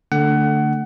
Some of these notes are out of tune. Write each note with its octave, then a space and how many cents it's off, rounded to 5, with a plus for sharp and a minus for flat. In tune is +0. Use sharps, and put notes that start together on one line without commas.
D3 +0 A3 +15 F#5 +25